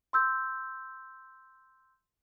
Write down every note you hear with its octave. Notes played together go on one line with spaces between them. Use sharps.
C6 E6 G6